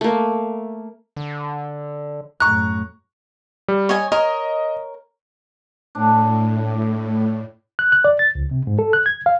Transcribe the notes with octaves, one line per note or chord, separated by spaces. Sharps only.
A3 A#3
D3
F#2 A2 A#5 C#6 F#6
G3
C#5 D#5 G#5
A#4 C#5 D#5
A2 D4
F#6
F#6
D5
A6
C#2
C3
G#2
A4
F#6
G#6
F5